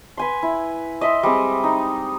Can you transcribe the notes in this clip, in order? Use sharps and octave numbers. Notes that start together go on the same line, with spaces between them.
B4 G#5 C6
E4
D#5 E5 C6
G3 G#3 C4
D#4